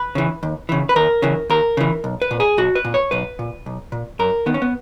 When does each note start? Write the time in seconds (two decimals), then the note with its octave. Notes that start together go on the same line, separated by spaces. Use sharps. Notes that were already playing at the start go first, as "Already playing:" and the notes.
Already playing: B4
0.15 C#3 E3
0.43 D#2
0.69 C#3 E3
0.89 B4
0.96 D#2 A#4
1.22 C#3 E3
1.50 D#2 A#4
1.77 C#3 E3
2.04 B1
2.22 B4
2.31 A#2
2.40 G#4
2.58 B1 F#4
2.75 B4
2.85 A#2
2.94 C#5
3.11 B1 B4
3.39 A#2
3.66 B1
3.92 A#2
4.19 F#2 A#4
4.46 D#3 B3
4.54 C#4
4.62 B3